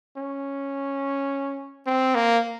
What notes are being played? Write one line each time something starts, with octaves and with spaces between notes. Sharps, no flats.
C#4
C4
A#3